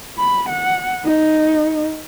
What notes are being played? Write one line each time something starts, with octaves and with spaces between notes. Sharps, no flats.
B5
F#5
D#4